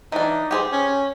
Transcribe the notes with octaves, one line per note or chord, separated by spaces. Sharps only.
E3 D4 D#4
G4 G#4 C5
C#4